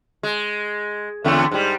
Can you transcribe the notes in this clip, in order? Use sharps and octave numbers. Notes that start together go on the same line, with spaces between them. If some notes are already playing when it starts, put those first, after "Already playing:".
G#3
E2 D3 A3
G#2 G3